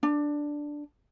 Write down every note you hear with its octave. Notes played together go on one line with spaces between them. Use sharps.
D4